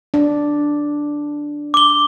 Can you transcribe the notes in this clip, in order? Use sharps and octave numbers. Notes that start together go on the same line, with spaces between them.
D4
D6 G7